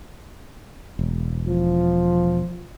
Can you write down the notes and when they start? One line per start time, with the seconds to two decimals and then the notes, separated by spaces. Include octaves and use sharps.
0.99 E1
1.48 F3